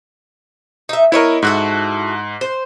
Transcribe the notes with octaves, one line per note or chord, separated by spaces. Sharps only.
D#4 E5
B3 E4 A#4 C#5 D#5
G#2 E4 F#4 A4 F#6
C5